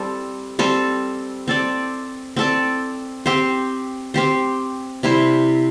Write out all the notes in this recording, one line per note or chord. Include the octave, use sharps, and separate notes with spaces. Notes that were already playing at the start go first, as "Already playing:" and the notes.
Already playing: G3 C4 A4
G3 C4 A4
C4 A4 D5
C4 A4 D5
C4 G4 C5
C4 G4 C5
C3 G3 E4 C5